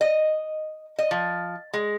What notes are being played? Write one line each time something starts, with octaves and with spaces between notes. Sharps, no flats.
D#5
D#5
F3
G#3